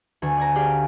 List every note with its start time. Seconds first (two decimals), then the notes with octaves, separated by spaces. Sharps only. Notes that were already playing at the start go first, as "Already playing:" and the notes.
0.22 D2 G#5
0.37 D5 G#5 A#5
0.55 G4 G#4 D5 F5 G5